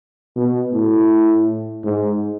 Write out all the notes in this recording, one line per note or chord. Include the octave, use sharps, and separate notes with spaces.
B2
A2
G#2